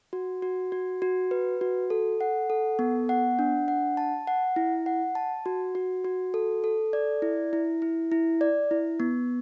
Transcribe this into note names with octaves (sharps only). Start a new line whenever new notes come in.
F#4
F#4
F#4
F#4
B4
F#4
A4
F#5
A4
B3
F#5
D4
F#5
A5
F#5
E4
F#5
A5
F#4
F#4
F#4
A4
A4
D5
E4
E4
E4
E4
D5
E4
B3